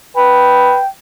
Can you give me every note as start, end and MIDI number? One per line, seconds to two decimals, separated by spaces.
0.16 0.77 71
0.16 0.88 79